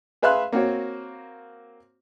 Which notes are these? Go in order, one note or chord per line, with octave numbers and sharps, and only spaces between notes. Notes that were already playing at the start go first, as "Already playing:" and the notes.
G#4 B4 E5 F5 C6 F#6
A#3 C4 F#4 C#5